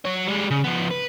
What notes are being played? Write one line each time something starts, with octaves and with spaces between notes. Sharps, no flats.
F#3 C#5
G3 G#3
C#3
F3 B3
B4